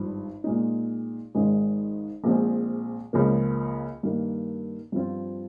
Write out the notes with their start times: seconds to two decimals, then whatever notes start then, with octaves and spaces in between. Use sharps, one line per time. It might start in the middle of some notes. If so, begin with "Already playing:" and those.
Already playing: G#1 G2 F3
0.44 A#2 G#3 D#4
1.35 G#1 G#2 D#3 G#3
2.24 A#1 A#2 G#3 C4
3.13 C#2 C#3 F3 A#3
4.03 G2 D#3 A#3
4.92 G2 F3 C4 F4